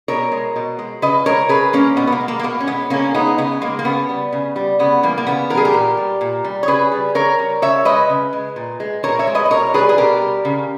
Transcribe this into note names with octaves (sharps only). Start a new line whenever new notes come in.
B2 A#4 C#5
G#3
B2
G#3
C#3 B4 D#5
G#3 A#4 C#5
C#3 G#4 B4
G#3 A#3 C#4
B2 B3
B3
A#3
G#3
A#3
A#3
B2 B3
C#4
G#3 B3
C#3 A#3 C#4
G#3 B3 D#4
C#3 B3
G#3 A#3
A#3
C#3 B3
G3
C#3
G3
C#3 B3
E3 G3 A#3
A#3
C#3 B3
E3 G3 G#4 A#4
G4 A#4
A#2
G3
A#2
G3
C#5
C#3 G#4 B4
G3
C#3 A#4 C#5
G3
C#3 C#5 E5
G#3 B4 D#5
C#3
G#3
A#2
G#3
A#2 A#4 C#5
C#5 E5
G#3
B4 D#5
D#5
B2 A#4 C#5
G3 G#4 B4
G#4
B2 G4 A#4
G3
C#3